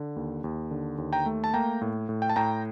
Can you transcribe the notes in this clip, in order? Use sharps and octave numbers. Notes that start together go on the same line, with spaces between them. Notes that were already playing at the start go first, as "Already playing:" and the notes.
Already playing: D3
D#2
D#2
D3
D#2
G5 A#5
A3
A5
A#3 G5 A#5
A2
A2
G5
A5
A2 G5 A#5